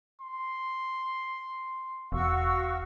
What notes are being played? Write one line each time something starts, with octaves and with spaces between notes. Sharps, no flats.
C6
E1 F#4 F5 C#6 E6